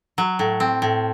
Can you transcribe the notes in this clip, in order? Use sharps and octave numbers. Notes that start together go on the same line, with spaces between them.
F#3
A2
C4
A2